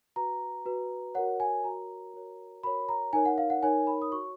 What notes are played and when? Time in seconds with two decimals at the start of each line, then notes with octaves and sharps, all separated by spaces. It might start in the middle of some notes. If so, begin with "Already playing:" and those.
0.16 F#4 B4 A#5
0.66 F#4 B4
1.15 F#4 A#4 C#5 F#5
1.40 G#5
1.64 F#4 A#4 C#5 A#5
2.14 F#4 A#4 C#5
2.63 F#4 A#4 C#5 B5
2.89 A#5
3.13 D#4 A#4 C#5 G#5
3.25 F#5
3.38 F5
3.50 F#5
3.63 D#4 A#4 C#5 G#5
3.87 B5
4.02 D#6
4.12 F#4 C#5 C#6